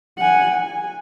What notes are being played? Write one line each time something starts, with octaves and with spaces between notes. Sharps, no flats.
F#5 G#5
G#5